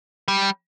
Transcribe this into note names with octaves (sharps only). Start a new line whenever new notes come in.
G3